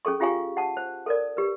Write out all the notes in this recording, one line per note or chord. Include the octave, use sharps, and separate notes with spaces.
C#4 G#4 A4 C#6
C#4 F4 G4 F5 G#5 C#6
F#5 A5
C5
A4 A#4 D5
G4 B4